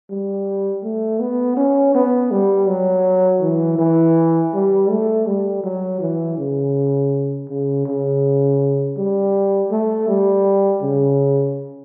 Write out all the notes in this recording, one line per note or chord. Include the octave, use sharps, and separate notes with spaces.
G3
A3
B3
C#4
B3
G3
F#3
E3
E3
G3
A3
G3
F#3
E3
C#3
C#3
C#3
G3
A3
G3
C#3